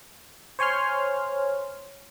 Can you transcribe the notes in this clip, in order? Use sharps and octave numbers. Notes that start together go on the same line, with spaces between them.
C5 C#5 G#5 C6 F6